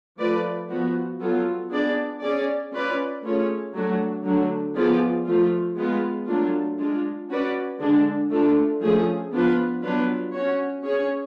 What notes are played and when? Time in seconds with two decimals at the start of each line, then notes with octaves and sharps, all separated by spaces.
0.19 F3 A3 F4 B4 D5
0.69 F3 B3 F#4
1.20 F#3 B3 F4 A4
1.71 B3 D4 G#4 D5
2.22 C#4 G#4 D5
2.73 C#4 F4 B4 D5
3.23 A3 C#4 F4 G#4 C#5
3.74 F#3 A3 D4 F#4
4.25 D3 F#3 A3 D4 F#4
4.76 F3 B3 F4 G#4 D5
5.26 F3 A3 F4
5.77 G#3 B3 F4
6.27 F#3 A3 D4 F4
6.79 G#3 D4 F4
7.30 C#4 F#4 B4 D5
7.80 D3 G#3 D4
8.31 A3 D4 F4 A4
8.81 F3 A3 C#4 G#4
9.32 F3 B3 D4 F4 B4
9.83 F#3 B3 D4 F4 B4
10.34 C#4 F#4 C#5
10.85 C#4 G#4 C#5